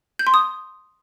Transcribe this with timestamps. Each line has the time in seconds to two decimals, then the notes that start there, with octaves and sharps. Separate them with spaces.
0.19 G6
0.27 C6
0.34 D#6